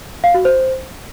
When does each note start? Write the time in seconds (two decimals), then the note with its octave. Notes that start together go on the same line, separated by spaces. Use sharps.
0.24 F5
0.34 F#4
0.45 C5